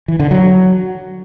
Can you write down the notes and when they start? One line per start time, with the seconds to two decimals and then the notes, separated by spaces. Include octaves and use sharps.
0.08 E3
0.20 D3
0.31 F#3